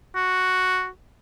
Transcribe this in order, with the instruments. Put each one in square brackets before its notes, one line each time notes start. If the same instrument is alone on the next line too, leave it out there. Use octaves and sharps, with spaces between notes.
[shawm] F#4